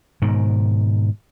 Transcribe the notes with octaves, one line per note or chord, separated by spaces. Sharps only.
G#2 B2 D#3